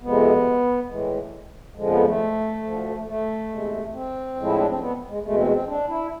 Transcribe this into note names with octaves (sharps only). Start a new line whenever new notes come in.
F2 C3 G#3 B3
A2 E3 G#3
F2 D3 F3 G#3
B3
A3
D2 D3 F3
A3
E2 C3 G#3
C4
A2 F3 G#3
E4
D4
C4
B3
G#3
E2 B2 G#3 A3
C4
C4
D4
E4